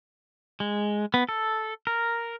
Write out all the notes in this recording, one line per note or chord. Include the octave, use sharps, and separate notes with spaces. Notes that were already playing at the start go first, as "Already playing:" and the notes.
G#3
B3
A4
A#4